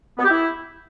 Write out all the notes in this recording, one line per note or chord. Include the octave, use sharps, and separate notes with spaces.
B3
G4
E4